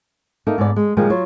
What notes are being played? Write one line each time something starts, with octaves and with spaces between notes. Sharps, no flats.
A#3 D#4 A4 E5
G#2 B3 D5
G#3
A#2 D#3 F3 G3 G#3 A#3
F#3 F4 C#5